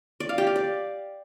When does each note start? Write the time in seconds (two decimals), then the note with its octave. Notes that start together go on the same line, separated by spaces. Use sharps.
0.20 D5
0.29 F5
0.38 G4
0.47 F5
0.56 D5